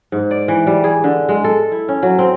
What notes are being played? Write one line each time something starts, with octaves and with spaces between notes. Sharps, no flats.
G#2
D5
E3
G3
G#4
D3
G#3
A4
E4
C#4
F#3
C4